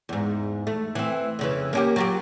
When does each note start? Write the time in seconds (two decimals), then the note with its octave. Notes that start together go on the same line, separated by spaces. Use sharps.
0.09 E2 G#2
0.67 A3
0.95 E3 C4
1.39 F2 C#3 E3
1.73 A#3 C#4 G4
1.96 F#3 F4 G4